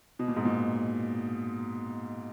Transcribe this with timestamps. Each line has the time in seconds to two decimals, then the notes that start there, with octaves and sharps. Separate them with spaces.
0.19 B2
0.28 A#2
0.36 G#2
0.45 A#2